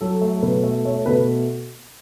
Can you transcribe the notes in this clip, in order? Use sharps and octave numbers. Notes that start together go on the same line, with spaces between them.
F#3 A4
A3
A4
B2 B4
A3
A3 C#5
B2 B4